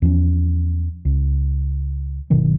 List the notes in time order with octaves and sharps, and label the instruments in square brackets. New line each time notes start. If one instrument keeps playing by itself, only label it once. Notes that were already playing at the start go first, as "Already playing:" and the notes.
[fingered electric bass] E2 F3 C#4
C#2
G1 B2 D#3 F#3